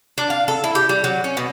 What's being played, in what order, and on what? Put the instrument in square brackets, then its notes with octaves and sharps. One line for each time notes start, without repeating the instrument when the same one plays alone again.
[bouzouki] D4
F5
A4
E4
G4
G3
F#3
C#4
B2